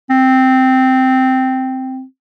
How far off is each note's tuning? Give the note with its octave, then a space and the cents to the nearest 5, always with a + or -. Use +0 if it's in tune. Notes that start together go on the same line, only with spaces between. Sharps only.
C4 -5